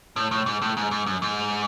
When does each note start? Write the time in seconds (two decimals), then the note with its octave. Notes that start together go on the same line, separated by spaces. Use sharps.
0.16 A2
0.31 A2
0.46 G#2
0.62 A2
0.77 G#2
0.91 G#2
1.06 F#2
1.22 G#2